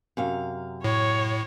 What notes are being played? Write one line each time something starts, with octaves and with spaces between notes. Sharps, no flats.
F#2 C3 F5
A2 C#5